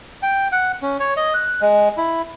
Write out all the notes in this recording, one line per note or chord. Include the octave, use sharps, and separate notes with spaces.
G5
F#5
C#4
C#5
D#5
F#6
G#3
E4